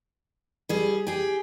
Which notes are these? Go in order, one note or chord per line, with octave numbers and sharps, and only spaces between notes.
G3 G#4
G4 G#4